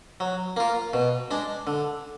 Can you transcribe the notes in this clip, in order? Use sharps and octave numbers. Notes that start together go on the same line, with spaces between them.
F#3
A#3 F4
B2
G#3 D4
D3